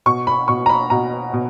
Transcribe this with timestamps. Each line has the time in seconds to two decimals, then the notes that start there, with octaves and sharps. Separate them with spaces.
0.06 B2 C#6
0.27 B5
0.48 B2 C#6
0.66 A#5
0.69 B5
0.90 B2 A#5
1.33 B2